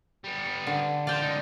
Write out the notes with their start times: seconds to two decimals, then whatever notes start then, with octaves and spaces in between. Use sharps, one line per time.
0.24 G3 B3
0.67 D3
1.07 F4 C5 D5 G5
1.22 C#2 D#4